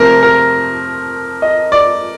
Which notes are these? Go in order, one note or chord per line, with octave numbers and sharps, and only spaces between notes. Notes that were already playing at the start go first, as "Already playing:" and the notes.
Already playing: C3 F3 A3 C4 A#4
A#4
D#5
D5